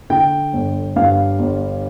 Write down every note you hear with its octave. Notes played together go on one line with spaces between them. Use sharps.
D3 G5
G1
G2 F5
G1